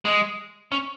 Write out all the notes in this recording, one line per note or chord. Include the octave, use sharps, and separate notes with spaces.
G#3
C#4